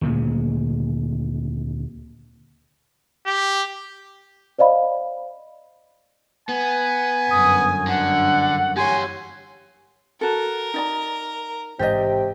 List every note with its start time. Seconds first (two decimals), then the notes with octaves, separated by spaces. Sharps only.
0.01 D2 A#2 C#3 G#3
3.26 G4
4.59 C5 D5 D#5 F5 B5
6.49 B3 G#5
7.30 G1 F#2 D#6
7.87 D3 F#5
8.77 G4 C#5 G#5 C6
10.21 F#4 A4 A#4
10.74 D#4 D5 A#5
11.79 A1 G#2 C3 G4 D5 D#5 G5